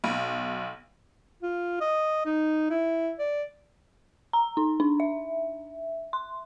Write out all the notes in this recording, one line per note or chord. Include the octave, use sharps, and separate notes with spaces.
B1
F4
D#5
D#4
E4
D5
A#5
D#4
D4
E5
C6